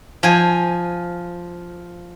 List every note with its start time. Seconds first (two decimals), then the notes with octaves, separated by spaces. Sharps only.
0.23 F3 G#5